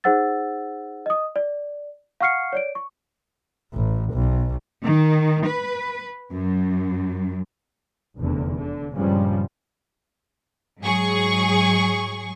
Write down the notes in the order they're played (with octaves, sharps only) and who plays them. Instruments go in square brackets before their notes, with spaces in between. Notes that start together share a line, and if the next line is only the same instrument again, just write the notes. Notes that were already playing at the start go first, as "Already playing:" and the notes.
[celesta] D#4 G#4 C5 F#5 E6 A6
D#5 D#6
D5
F5 F#5 C#6 F6 C7 C#7
C#5 D5 D7
C#6
[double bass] A1
B1
[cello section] D#3
B4
F#2
[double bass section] F1 E2 D3
D3
G2 A#2 C#3 F3 G3 G#3
[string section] G#2 F#3 G#4 C#6